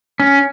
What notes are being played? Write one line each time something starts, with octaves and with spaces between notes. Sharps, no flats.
C#4